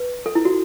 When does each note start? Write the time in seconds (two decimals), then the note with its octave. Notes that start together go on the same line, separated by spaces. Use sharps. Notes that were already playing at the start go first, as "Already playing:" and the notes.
Already playing: B4
0.26 A4
0.35 E4
0.45 F#4